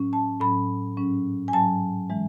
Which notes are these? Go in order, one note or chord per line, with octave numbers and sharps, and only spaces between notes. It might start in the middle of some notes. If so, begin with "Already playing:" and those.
Already playing: A2 F#3 C#4
A5
A2 F#3 C#4 B5
G#2 F#3 C#4
G#5
G#2 F#3 C#4 A5
E3 G#3